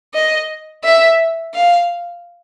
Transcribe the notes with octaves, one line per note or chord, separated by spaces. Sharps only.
D#5
E5
F5